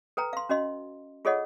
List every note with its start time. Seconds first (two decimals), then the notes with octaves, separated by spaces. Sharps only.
0.17 A4 B4 G5 A#5
0.33 F5 C6
0.49 C#4 F#4 D#5 C6
1.25 F4 G#4 A4 C#5 D#5 F#5